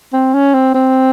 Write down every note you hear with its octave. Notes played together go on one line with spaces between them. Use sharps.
C4
C#4
C4
C4